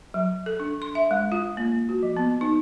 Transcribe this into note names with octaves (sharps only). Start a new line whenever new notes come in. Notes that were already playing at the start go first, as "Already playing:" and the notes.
F#3
A4
D4
C6
E5
G#3
F4
A#3
F#4
F3
B3
D#4